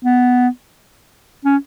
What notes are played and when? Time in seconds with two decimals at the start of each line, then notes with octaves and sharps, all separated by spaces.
0.05 B3
1.45 C#4